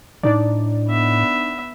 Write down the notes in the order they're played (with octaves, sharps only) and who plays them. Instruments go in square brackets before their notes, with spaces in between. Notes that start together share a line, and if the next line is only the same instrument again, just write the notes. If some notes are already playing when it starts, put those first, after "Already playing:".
[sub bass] A2 [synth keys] D4 D#4 D5
[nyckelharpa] B3 E5